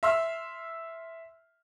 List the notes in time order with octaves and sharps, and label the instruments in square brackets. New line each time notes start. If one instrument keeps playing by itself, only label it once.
[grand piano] E5 C6 E6 F6